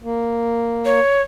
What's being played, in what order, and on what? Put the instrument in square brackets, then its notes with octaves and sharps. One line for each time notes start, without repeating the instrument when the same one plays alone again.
[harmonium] A#3
[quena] C#5